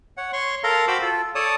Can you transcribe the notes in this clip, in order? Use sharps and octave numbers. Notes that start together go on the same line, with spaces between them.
C#5 F#5
C#5 C6 C#6
A4 A#4 F5 A#5 C6
F#4 C5 G5 B5 D6 E6
F4 A4
A4 C#5 D5 A5 D#6